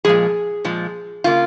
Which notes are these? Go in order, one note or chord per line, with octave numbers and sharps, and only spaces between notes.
A#2 F3 G#3 G#4
A#2 F3 G#3
C#3 A#3 F4